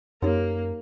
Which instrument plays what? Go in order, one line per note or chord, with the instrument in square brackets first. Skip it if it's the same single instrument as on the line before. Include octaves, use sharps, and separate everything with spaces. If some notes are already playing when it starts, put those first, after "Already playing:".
[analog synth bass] F#2 [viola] A#3 [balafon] D#4 G4 C#5